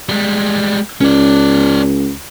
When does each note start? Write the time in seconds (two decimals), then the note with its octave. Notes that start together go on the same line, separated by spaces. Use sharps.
0.09 G3 G#3
1.01 C#2 C#4 D5